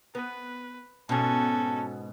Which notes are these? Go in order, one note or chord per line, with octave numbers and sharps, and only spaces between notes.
B3 B4
G#2 B2 C#4 A4 A5